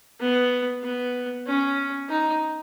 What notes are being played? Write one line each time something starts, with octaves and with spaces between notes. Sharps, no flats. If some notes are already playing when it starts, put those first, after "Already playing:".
B3
B3
C#4
D#4